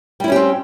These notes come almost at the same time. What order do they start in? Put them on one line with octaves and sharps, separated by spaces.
G3 E4 C#4 G4 C4